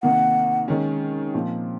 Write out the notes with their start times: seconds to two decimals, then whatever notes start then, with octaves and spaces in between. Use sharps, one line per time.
0.03 C3 D#3 A#3 F#5
0.68 D#3 G#3 C#4
1.34 A#2 F3 C4 F4